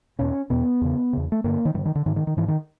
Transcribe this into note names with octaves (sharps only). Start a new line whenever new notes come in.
E2 B2 C#4
E2 B2 B3
E2 C#3
E2 C#3
A3
G2 D3 A#3
D#3
G2 D3 E3
D#3
D3
G#2 D#3
D#3
D#3
G#2 E3
D#3